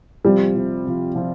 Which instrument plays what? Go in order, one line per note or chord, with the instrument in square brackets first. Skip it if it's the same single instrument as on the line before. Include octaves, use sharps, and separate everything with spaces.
[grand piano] C3 F3 C4 F4 [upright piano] G3
[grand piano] C3 F3 C4 F4
C3 F3 C4 F4
C3 F3 C4 F4